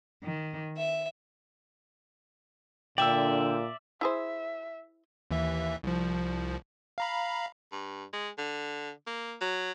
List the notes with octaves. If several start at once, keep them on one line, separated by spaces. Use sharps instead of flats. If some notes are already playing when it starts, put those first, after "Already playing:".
D#3
E5
A#2 D3 D5 E5 G5 E6
E4 G#4 C5 E5
D#2 E3 E5
C2 F3
F5 A#5 B5
G2
G#3
D3
A#3
F#3